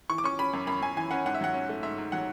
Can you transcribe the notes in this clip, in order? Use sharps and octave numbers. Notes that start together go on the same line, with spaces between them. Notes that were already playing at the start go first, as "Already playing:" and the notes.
E3 C#6
D6
C#4 C#6
C#4 B5
F#2
F#2 B5
F#2 G#5
E3 G#5
C#4 F#5
G#2 F#5
E5
F#3 F#5
C#4
A3
G#2 E5
G#2
F#3 F#5